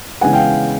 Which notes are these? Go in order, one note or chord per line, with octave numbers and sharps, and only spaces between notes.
C#3 E3 G#3 B3 F#5 G#5
F5 G5